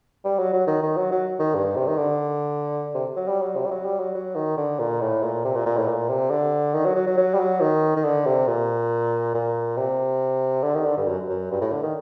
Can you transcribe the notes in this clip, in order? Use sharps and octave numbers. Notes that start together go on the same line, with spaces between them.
G3
F#3
F#3
D#3
D#3
F#3
F#3
D#3
G2
C3
D#3
D3
C3
F#3
G3
F#3
C3
G3
F#3
G3
F#3
F#3
D#3
D3
A#2
A2
A#2
C3
A#2
A#2
A2
A#2
C3
D3
D#3
F#3
F#3
F#3
F#3
G3
F#3
D#3
D#3
D3
C3
A#2
A#2
C3
D3
D#3
D3
G2
F#2
F#2
G2
A2
D3
D#3